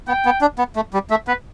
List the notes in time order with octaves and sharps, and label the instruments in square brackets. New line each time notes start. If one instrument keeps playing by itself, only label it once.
[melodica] B3 [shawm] G5
[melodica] B3
D4
B3
A3
G3
[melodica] A3 [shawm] E5
[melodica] B3 [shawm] B4